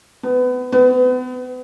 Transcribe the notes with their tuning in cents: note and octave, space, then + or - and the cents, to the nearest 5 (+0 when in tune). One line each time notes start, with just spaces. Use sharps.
B3 +25
B3 +35